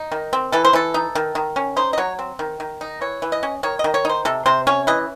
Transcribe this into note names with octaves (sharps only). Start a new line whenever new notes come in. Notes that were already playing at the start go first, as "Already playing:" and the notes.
Already playing: D#4
D#3
C4
E3 A4
C5
E3 A4
D#4
D#3
D#3
C#4
D#4 C5
D#5
F#3 C#5
C4
D#3
D#3
D#4
E3 C#5
E3
D#5
C#4
D#3 C#5
D#5
D#3
C#5
D#4 C5
C3 A4
C3 C5
C#4 C#5
E3 D#5